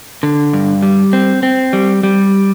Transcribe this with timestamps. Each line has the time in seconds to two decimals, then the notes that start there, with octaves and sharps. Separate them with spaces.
0.23 D3
0.53 G2
0.83 G3
1.13 C4
1.43 C4
1.73 G3
2.03 G3